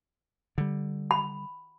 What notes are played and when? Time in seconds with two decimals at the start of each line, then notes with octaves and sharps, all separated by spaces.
0.58 D3 G3
1.11 B5